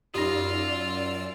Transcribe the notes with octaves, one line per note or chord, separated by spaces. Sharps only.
F#2 D#4 F4 G4 D5 E6